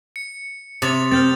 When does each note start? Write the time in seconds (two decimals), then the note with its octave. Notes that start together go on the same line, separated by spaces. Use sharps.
0.16 C#7
0.82 C3 D#6 A6 F7
1.11 C4 F6 G6 A6